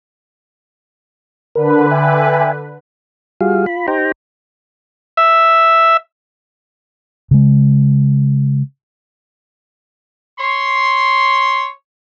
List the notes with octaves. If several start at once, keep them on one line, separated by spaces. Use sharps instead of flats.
D3 A#4 B4
E5 G5 G#5
G3 F4 F#4 G#4 F5
F4 B5
D#4 G4 C5 G5 A#5
E5
C#3 G#3
C#5 C6